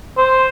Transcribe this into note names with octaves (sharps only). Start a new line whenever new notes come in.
C5